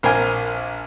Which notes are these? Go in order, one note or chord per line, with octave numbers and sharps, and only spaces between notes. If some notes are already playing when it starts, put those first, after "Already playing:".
A#1 A#4 C5 G#5